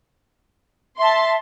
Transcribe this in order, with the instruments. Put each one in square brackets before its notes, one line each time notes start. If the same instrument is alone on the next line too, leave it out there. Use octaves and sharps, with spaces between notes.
[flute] E5 [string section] A5 C6